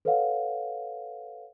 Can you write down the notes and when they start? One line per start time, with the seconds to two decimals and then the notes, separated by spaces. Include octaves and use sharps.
0.05 A4 B4 C#5 D#5 F5 F#5